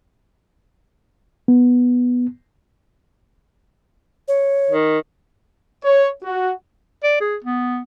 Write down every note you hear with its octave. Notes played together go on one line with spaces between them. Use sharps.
B3
C#5
D#3
C#5
F#4
D5
G#4
B3